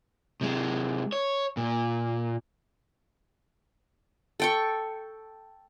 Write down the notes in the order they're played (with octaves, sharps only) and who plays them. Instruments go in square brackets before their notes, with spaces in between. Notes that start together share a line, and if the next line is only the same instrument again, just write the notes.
[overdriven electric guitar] C3 G#3
C#5
A#2
[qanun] A4 G5 C#6